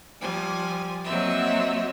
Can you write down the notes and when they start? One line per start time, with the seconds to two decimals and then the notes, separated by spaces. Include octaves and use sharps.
0.20 F3 G3 G#5
1.05 F#3 A#3 C4 D#5 E5